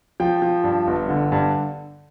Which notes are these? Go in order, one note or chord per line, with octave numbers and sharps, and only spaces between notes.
F3 G5
F3
G2
G1
D3
G2